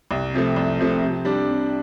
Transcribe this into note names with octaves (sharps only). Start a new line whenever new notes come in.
C2
C3 F3 A3
C2
C3 F3 A3
C3
G3 D4
C3